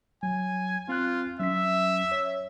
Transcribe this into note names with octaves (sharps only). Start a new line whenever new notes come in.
F#3 G#5
C4 F4 F#6
F#3 C#4 E5 B6
C#5